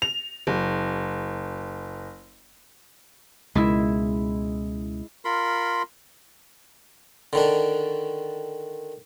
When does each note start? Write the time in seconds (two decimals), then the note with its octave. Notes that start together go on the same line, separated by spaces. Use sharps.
0.02 F7
0.47 F#1
3.55 C#2 B2 G#3 E4
5.24 F4 A#4 B5 C6
7.33 D3 D#3 D4